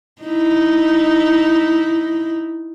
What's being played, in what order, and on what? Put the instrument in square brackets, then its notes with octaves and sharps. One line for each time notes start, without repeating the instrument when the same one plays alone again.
[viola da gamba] D#4 E4